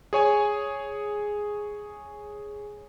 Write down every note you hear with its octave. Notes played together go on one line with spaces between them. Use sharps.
G#4 C#5 G#5